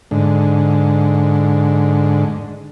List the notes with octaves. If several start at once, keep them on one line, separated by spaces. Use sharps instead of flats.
G#2 D3